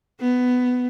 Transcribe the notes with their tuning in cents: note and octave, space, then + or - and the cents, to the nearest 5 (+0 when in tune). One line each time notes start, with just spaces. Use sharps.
B3 +10